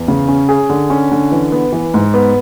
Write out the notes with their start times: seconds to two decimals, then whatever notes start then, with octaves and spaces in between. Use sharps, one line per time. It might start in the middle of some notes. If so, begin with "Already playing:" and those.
Already playing: E2
0.08 C#3
0.28 C#4
0.49 G#4
0.70 D3
0.90 C#4
1.11 D3
1.31 E3
1.52 B3
1.72 E3
1.94 G#2
2.14 B3